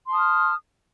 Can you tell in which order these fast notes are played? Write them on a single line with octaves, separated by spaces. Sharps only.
C6 A5 D#6 F6